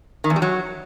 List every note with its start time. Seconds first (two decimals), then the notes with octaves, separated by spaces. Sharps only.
0.24 D#3
0.30 E2
0.36 G3
0.42 F#3